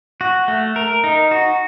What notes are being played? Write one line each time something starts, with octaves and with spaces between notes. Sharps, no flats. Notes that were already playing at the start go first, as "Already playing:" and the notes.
F#4
A3
A#4
D#4
F#4